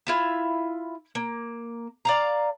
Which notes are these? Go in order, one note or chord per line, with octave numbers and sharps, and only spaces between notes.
E4 F4 E5
A#3
D5 F5 A#5